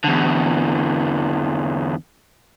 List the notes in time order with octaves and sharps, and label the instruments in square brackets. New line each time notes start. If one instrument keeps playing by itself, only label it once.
[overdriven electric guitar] E2 D3